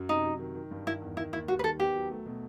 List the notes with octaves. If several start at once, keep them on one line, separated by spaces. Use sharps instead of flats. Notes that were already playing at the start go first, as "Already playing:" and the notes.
Already playing: F#2 F#3
C3 D#4
F#3
D#3
D#3
G2
D#3 E4
E2
D#3 E4
D#2 E4
G3 F#4
B4
D#3 A4
B3 G4
F#3
A3
B2